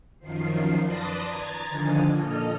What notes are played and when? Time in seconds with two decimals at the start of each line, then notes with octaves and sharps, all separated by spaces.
0.18 F#2 D#3 F3 C7
0.83 B4 D5 A5 C6 D#6 A#6
1.24 A#5 G#6 A6
1.69 D3 D#3 F3 D4 D#4 G#5
2.12 A#2 A4 D#5 F6